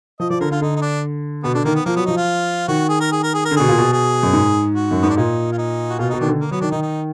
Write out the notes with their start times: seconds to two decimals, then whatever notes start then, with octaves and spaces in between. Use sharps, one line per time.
0.20 F3 D#5
0.30 F3 D5
0.41 D3 A#4
0.51 D3 F4
0.61 D3 D#4
0.76 D#4
0.82 D4
1.44 B2 B3
1.55 D3 D4
1.65 D#3 A#3
1.75 B3
1.86 F3 A#3
1.96 F#3 B3
2.06 F3 D#4
2.17 F4
2.68 D#3 F#4
2.89 G#4
3.01 A#4
3.12 G#4
3.23 A#4
3.34 G#4
3.45 A#4
3.51 D3
3.57 B2 G#4
3.69 A#2
3.78 B2
3.93 G#4
4.23 F#2
4.33 G#2
4.75 F#4
4.91 F#2
5.02 G#2 B3
5.10 D4
5.16 A#2 D#4
5.52 F4
5.58 D#4
5.89 F#4
5.99 B2 F4
6.10 B2 D#4
6.20 D#3 D4
6.27 D3
6.41 A#3
6.51 F#3 B3
6.61 D#3 D4
6.71 D#3 D#4
6.82 D#4